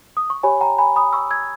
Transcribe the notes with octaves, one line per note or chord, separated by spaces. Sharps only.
D#6
C#6
G4 C#5 G#5 B5
G5 A#5
G#5 B5
B5 D#6
C#6 E6
E6 G#6